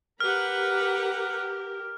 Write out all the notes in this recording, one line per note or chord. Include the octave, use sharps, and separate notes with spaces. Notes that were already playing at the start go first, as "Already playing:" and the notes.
G4 A#4 B4 F#5 F6